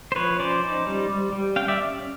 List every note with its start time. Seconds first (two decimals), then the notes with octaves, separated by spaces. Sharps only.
0.12 C5
0.16 F3 B4 C#5
0.40 C#4 C5 D5
0.63 D#4
0.87 G3
1.10 G3
1.33 G3
1.56 C#4 F5 G5
1.68 D5 E5